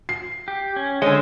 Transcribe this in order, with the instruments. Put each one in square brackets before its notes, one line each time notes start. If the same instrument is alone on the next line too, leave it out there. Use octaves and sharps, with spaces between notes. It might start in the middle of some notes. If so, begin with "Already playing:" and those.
[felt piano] C7
[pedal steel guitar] G4
C#4
[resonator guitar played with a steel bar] D3 G#3 [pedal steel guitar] C5 D#5 [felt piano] C#5